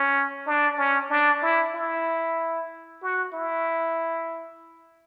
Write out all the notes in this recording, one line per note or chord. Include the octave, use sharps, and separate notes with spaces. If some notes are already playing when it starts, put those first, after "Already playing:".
Already playing: C#4
D4
C#4
D4
E4
E4
F#4
E4